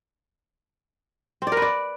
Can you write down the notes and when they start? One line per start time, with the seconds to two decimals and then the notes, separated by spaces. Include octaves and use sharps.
1.42 C4
1.47 D5
1.52 A#4
1.57 B4
1.62 D5